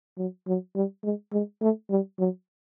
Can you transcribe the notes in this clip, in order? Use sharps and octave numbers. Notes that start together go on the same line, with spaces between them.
F#3
F#3
G3
G#3
G#3
A3
G3
F#3